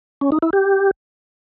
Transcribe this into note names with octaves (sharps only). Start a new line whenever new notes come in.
C#4
D#4
E4
G4